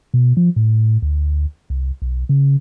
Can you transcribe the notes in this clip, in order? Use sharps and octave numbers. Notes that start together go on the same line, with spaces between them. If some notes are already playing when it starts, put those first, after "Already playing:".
B2
F3
A2
D2
C2
B1
C#3